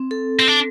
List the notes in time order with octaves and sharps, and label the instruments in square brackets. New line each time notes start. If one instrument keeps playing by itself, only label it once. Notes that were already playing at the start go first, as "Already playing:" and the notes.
Already playing: [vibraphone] C4
A4
[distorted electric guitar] C4
D4